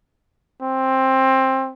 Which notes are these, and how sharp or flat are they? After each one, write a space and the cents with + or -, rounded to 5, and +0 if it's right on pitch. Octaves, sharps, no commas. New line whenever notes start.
C4 +15